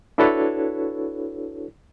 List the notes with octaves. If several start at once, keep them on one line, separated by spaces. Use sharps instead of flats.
D4 E4 F#4 A4 B4 C#5